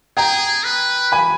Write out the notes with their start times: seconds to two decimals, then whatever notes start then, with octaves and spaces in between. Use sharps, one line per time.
0.17 G#4 G5 A#5
0.64 B4
1.12 G#5 B5